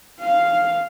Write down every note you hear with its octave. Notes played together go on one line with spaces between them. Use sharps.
F5